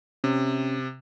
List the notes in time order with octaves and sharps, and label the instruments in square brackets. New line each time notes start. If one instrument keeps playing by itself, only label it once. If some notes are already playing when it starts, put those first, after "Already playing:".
[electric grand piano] C3 [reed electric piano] C#4